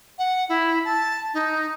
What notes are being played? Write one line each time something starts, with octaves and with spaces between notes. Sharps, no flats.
F#5
E4
A5
D#4